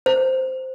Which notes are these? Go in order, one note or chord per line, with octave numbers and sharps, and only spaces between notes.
C5